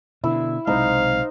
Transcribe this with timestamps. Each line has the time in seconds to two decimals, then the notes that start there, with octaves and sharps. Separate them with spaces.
0.24 B2 D3 E4 E6
0.67 B1 C3 G#3 D#4 C5 F5